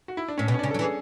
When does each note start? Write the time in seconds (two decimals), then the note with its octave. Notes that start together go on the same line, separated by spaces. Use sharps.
0.08 F#4
0.17 E4
0.28 D4
0.38 A2 C#4
0.47 B2 B3
0.54 C#4
0.59 D4
0.63 C#3
0.71 A4
0.74 F#3
0.79 E3
0.83 G#4